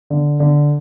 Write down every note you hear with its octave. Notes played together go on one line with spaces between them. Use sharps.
D3
D3